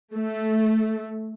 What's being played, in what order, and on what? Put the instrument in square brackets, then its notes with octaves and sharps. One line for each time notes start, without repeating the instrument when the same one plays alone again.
[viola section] A3